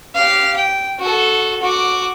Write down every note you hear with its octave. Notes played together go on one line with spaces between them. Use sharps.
G4 F5
G5
F#4 A4
F#4 D6